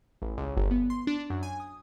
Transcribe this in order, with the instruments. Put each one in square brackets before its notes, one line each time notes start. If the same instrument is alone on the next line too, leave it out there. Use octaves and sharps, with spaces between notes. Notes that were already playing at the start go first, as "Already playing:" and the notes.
[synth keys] A1
C#2
G1
B3
C6
D4
F#2
G#5
D#6